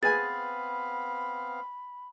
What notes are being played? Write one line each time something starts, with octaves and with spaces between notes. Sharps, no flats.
B3 C4 G#4 B4 F5 G#5 B5 A6